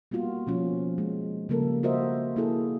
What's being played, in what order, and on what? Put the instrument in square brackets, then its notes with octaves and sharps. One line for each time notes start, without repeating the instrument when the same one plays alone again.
[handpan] G3 A#3 B3 F4 F#4
B2 F3 C#4
G#3
C#3 F3 G3 A#3 A4 A#4
F4 F#4 A#4 C5 D#5 E5
A#3 E4 G#4 A4